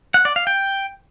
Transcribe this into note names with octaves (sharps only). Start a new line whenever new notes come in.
F#5
D5
F5
G5